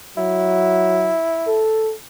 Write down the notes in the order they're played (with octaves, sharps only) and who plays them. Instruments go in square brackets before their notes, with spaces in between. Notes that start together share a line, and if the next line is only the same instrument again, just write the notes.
[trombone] F#3 [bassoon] E4
[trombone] A4